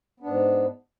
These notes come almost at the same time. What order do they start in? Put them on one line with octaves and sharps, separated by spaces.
B3 D4 G#2